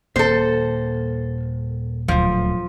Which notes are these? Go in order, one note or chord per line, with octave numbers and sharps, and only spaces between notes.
D#1 A#3 A4 C5
D1 D2 F3